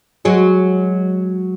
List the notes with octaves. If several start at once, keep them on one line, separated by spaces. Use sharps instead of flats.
F#3 G#3